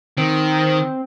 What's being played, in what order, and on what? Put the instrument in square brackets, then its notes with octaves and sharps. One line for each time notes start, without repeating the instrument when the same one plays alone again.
[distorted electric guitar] D#3 [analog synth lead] C4